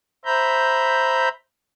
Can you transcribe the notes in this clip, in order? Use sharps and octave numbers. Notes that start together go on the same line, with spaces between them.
C5 E5 A#5 B5 G6